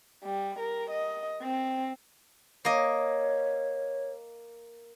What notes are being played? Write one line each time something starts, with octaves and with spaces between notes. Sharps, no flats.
G3
A#4
D#5
C4
A#3 C#5 D#5